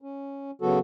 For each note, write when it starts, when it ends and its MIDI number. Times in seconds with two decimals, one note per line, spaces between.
0.02 0.51 61
0.62 0.79 49
0.62 0.79 54
0.62 0.79 59
0.62 0.79 66
0.62 0.79 69